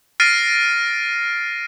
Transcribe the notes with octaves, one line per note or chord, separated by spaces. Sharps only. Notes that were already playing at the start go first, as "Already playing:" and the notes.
F6 A6 A#6 C7 D7 D#7